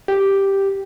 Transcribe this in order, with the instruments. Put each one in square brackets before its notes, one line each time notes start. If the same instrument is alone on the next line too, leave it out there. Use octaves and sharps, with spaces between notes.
[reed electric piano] G4